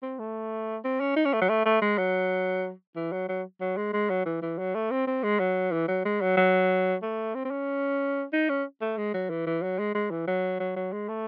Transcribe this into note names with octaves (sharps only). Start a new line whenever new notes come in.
C4
A3
C4
C#4
D#4
C#4
A3
F#3
A3
A3
G#3
F#3
E3
F#3
F#3
F#3
G#3
G#3
F#3
E3
E3
F#3
A3
C4
C4
G#3
F#3
E3
F#3
G#3
F#3
F#3
A3
C4
C4
C#4
D#4
C#4
A3
G#3
F#3
E3
E3
F#3
G#3
G#3
E3
F#3
F#3
F#3
G#3
A3